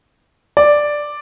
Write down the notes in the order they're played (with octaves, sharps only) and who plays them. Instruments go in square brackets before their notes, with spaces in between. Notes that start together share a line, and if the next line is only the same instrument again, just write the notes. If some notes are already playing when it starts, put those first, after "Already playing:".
[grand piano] D5